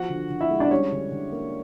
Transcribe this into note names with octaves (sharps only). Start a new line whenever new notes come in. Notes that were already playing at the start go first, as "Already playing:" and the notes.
Already playing: F3 F#4 F#5
D3
D3
E4 E5
G#3
D4 D5
G3 C#4 C#5
D3
D3
A#3